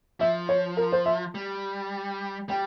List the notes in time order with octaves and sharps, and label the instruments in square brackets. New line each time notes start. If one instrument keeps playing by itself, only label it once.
[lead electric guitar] F3 [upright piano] E5
[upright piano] C#5
A#4
C5
E5
[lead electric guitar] G3
[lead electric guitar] G3 [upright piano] G5